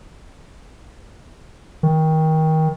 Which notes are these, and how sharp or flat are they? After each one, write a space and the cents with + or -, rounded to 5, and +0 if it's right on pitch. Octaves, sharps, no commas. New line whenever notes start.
D#3 +25